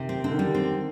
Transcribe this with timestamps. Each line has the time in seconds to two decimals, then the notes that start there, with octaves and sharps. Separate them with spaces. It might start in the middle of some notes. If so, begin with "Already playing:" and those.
Already playing: C3 D#3
0.09 C4
0.24 D3 C4
0.31 D#3
0.38 D3 G3
0.55 C4